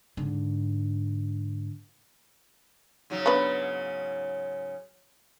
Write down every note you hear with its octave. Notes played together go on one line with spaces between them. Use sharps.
G#2 D3
G#2 C#3 F#3
B3 D4 B4